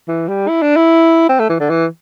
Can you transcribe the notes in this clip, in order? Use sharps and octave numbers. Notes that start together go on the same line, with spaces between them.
E3
G3
E4
D4
E4
C4
A3
E3
D3
E3